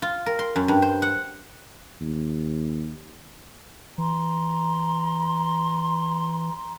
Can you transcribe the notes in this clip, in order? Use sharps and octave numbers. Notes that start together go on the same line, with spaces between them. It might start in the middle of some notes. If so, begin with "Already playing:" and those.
F4
A#4
C6
F#2
G2
C5
F#5
D#2
E3 A#5 C6